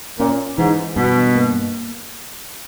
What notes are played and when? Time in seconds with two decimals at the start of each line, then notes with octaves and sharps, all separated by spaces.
0.19 A#2 C#4
0.58 G#2 E3
0.96 G2 B2
1.35 A#3